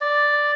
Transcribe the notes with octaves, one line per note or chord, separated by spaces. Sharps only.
D5